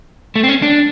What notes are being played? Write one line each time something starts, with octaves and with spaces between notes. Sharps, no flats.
A3
C4
C#4
D4